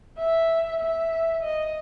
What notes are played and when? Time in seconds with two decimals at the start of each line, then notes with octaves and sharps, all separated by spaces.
0.18 E5
0.80 E5
1.42 D#5